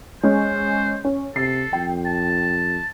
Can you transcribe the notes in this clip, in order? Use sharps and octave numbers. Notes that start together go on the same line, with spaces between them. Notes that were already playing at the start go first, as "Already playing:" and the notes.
G#3 C#4 C5
C#4
C3 A4 C7
F2 G5
A5